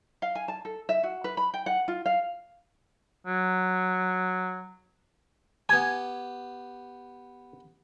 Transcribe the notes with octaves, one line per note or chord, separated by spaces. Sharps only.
F5
G#5
A5
A4
E5
F#4
B4
B5
G5
F#5
F4
F5
F#3
B3 G4 G#5